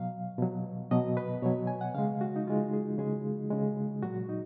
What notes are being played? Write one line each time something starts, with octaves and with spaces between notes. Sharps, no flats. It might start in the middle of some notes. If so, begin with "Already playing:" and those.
Already playing: B2 F#3 F5
B2 F#3
B2 F#3 D#5
B4
B2 F#3 C#5
G#5
F#5
C#3 G#3 F5
F#4
D#4
C#3 G#3 F4
G#4
C#3 G#3 G#4
C#3 G#3
A#2 F#3 F#4
D#4